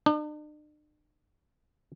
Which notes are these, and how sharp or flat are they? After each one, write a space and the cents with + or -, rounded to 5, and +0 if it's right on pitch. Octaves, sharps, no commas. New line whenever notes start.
D4 +45